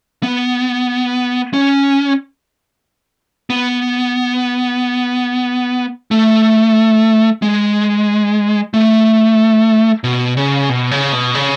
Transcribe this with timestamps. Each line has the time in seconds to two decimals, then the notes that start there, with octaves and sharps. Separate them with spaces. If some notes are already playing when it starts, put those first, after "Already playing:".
0.23 B3
1.54 C#4
3.50 B3
6.11 A3
7.42 G#3
8.74 A3
10.04 B2
10.37 C#3
10.69 B2
10.91 C#3
11.13 B2
11.35 C#3